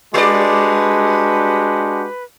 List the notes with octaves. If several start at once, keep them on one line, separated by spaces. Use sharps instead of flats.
G3 G#3 D4 F#4 G4 B4 D5